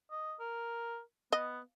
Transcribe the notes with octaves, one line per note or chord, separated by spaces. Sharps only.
D#5
A#4
B3 D#5